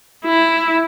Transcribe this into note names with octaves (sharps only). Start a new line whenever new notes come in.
E4